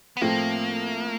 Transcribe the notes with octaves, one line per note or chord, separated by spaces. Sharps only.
B3
A2 F3 A3 A#3 C4